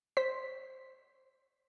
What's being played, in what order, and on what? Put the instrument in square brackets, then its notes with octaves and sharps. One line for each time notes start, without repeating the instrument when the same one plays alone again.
[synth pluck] C5 B6